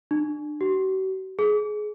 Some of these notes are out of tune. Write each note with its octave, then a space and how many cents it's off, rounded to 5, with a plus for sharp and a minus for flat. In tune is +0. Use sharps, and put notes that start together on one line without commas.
D4 +30
F#4 +45
G#4 +20